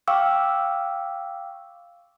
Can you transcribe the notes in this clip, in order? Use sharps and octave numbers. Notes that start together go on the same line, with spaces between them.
F5 G5 C#6 D6 E6